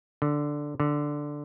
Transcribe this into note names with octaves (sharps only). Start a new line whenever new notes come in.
D3
D3